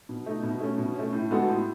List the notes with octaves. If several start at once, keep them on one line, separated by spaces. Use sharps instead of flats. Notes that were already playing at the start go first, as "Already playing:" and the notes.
B2
A3 D#4
B2
A3 C#4
B2
A3 C#4
A2
G#3 B3 F#4 A4
A2